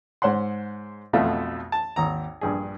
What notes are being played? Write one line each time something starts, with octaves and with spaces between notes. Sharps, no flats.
G#2 C5 C#5 F#5 C6
B1 F2 B2 A3 F4 E5
A5
G#1 D#2 A#5
A#1 G2 G#4